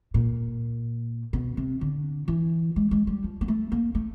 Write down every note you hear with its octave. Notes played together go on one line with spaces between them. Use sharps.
A#2
B2
C3
D3
E3
G#3
G#3
G3
F3
A#3
A3
A#3
A3